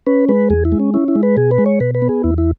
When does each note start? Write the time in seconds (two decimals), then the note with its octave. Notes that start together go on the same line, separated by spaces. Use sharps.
0.07 C#4 B4
0.29 G#3 B4
0.50 E2 G#4
0.65 E4
0.72 G#3
0.80 C#4
0.94 C#4 E4
1.08 E4
1.15 G#3
1.23 B4
1.37 B2 G#4
1.51 B4
1.58 G#3
1.66 C#5
1.80 B2 B4
1.95 B4
2.02 B3
2.09 G#4
2.24 E2 E4
2.38 E4